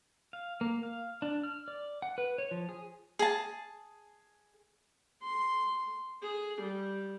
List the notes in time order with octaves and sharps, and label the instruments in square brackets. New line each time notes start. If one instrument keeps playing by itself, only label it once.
[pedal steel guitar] F5
A#3
F5
D4
F6
D5
F#5
B4
C#5
F3
G#4
[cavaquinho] G#4 A5
[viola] C6
G#4
G3